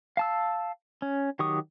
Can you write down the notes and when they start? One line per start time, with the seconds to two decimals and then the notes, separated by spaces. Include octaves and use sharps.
0.17 F5 A5 E6
1.02 C#4
1.39 D#3 F#3 G4 C#6 D#6